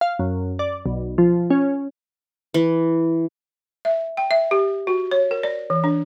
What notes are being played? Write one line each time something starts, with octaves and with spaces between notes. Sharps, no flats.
F5
F#2
D5
B1
F3
C#4
E3
E5
G5
E5
G4
F#4
C#5
A#4
D5
E3
D4